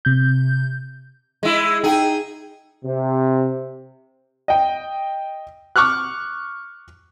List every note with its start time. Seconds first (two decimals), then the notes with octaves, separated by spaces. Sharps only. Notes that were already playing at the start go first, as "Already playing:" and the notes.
0.05 C3 G6
1.43 G#3 E4
1.84 D#4 G#4 G5
2.84 C3
4.48 D#5 G5
5.76 C#6 D6 F6 F#6